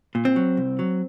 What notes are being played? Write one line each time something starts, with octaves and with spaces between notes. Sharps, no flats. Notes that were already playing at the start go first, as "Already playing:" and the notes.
A#2
C4
F#3
C2
F#3